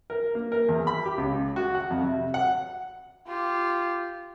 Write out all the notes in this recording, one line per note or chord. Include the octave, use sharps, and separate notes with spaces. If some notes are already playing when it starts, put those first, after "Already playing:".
A#4
A#3
A#4
E2
B5
G4
C#2
F#4
F#5
F2
C3
F#5
F4 G4